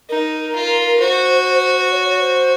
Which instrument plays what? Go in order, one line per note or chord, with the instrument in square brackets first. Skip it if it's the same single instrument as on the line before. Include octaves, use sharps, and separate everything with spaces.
[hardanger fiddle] D#4 [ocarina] A#4
[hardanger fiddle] F4
[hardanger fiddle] F#4 [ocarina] C5
[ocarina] C#5
C#5
C5